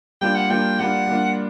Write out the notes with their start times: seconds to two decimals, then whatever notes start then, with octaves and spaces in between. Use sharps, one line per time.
0.21 G3 A#3 D4 F4 G5
0.35 F#5
0.50 G3 A#3 D4 F4 G5
0.79 G3 A#3 D4 F4 F#5
1.07 G3 A#3 D4 F4